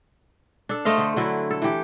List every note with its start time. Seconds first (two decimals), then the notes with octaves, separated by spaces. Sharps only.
0.69 D4 A4
0.85 A3 C5 D#5 F5
0.98 D3
1.16 D3 F#3 E4
1.51 A4
1.62 E3 G4